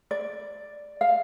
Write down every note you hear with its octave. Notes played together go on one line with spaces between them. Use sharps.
D5
F5